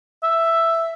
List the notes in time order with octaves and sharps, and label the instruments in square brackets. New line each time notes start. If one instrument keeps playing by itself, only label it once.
[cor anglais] E5